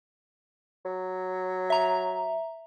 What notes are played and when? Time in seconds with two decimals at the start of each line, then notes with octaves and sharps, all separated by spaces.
0.85 F#3
1.70 E5 A#5